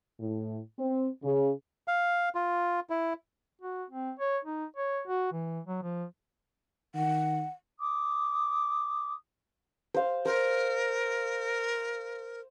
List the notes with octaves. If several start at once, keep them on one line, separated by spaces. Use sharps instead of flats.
A2
C4
C#3
F5
F4
E4
F#4
C4
C#5
D#4
C#5
F#4
E3
F#3
F3
D#3 F#5
D6 D#6
C5 F5
A#4 C5